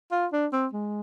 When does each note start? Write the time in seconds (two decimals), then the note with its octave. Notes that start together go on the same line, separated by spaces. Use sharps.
0.12 F4
0.33 D4
0.53 C4
0.73 G#3